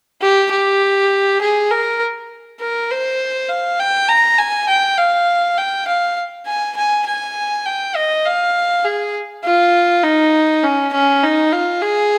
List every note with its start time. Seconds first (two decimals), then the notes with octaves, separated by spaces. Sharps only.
0.22 G4
0.52 G4
1.42 G#4
1.71 A#4
2.60 A#4
2.90 C5
3.49 F5
3.79 G5
4.09 A#5
4.38 G#5
4.68 G5
4.97 F5
5.58 G5
5.87 F5
6.47 G#5
6.77 G#5
7.06 G#5
7.66 G5
7.95 D#5
8.26 F5
8.84 G#4
9.44 F4
10.03 D#4
10.63 C#4
10.93 C#4
11.23 D#4
11.52 F4
11.82 G#4